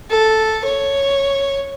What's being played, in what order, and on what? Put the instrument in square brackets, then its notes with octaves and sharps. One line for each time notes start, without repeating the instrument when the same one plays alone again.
[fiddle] A4
C#5